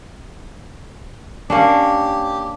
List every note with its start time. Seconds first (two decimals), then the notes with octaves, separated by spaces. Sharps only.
1.50 A#3 C#4 D4 G4